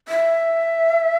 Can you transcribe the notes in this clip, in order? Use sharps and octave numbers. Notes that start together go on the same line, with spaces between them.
E5